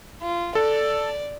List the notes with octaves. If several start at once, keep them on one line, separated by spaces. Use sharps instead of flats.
F4
A4 D5